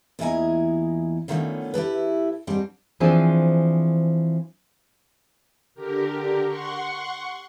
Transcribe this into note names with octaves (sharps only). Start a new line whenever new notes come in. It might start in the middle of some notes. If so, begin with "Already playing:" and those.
E2 A#2 E4 D#5 G#5 A#5
D3 D#3 F3 A3 B3 C#4
E4 G4 A4 B4
G#2 G3 C4 D4
E3 F3 C4 D4 G#4
D3 G4 A#4
F#5 C6 C#6